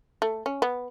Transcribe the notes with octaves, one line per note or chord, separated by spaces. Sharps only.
A3
C#4
B3